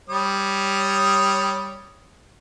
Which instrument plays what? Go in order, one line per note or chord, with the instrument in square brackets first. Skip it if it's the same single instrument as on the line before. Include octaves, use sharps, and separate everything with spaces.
[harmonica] G3 C#5 D#6